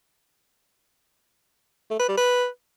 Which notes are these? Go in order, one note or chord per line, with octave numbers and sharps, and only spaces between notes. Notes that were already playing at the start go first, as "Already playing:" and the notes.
A3
B4
G3
B4